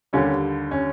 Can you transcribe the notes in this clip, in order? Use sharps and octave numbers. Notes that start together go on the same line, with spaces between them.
D#2 D3 G3 C#4
C#4